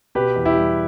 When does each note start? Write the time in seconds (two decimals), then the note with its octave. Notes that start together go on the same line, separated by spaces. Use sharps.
0.15 B2 G4 B4
0.36 E2
0.45 E4 G4
0.56 G3